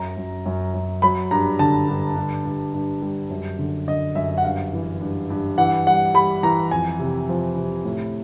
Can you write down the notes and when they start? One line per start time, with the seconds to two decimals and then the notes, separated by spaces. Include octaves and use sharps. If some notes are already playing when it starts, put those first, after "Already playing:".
Already playing: F#2 A#5
0.17 F#2
0.46 F#2
0.74 F#2
1.02 F#3 B5
1.31 G2 A#5
1.59 D3 A5
1.88 G2
2.16 G2
2.45 G2
2.74 G2
3.02 G3
3.30 F#2
3.59 D3
3.87 D3 D#5
4.15 F#2 E5
4.38 F#5
4.44 G2 F5
4.73 E3
5.01 G2
5.30 G2
5.58 E3 F#5
5.87 G3 F#5
6.14 G3 B5
6.43 E3 A#5
6.71 F2 G#5
7.00 C3
7.29 F3
7.57 C3
7.85 A2